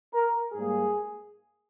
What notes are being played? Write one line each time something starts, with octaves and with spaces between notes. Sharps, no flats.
A#4
G#2 G3 A#3 G#4